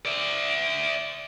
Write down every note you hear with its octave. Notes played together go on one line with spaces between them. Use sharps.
D5 E5